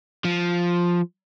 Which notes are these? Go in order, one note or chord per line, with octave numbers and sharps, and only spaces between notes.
F3